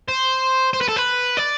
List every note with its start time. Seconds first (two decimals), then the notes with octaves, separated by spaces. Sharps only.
0.08 C5
0.73 C5
0.81 B4
0.88 A4
0.96 B4
1.37 D5